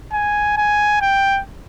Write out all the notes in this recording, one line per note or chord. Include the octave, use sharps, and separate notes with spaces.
G#5
G#5
G5